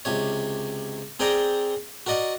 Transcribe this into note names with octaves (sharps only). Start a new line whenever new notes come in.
C#2 C3 C#5
C4 G#4 A#4 D5 G5 A#5
F#4 A#4 D5 D#5 F#5